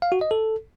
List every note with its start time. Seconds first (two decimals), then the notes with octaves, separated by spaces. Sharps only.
0.02 F5
0.12 F#4
0.21 D#5
0.31 A4